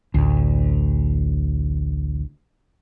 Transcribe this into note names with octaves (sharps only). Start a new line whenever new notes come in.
A1 D2